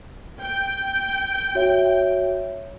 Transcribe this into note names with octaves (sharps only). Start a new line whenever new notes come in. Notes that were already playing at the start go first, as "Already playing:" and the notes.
G5
F#4 C#5 E5